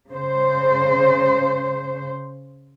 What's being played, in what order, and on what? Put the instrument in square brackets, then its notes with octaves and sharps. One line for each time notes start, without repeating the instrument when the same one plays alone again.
[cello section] C#3 C5